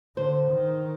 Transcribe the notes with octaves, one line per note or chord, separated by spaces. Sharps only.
D3 C5
D#3